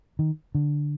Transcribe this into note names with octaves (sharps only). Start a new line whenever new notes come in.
D#3
D3